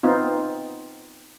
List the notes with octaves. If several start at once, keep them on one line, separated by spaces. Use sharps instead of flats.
B3 C4 D#4 F4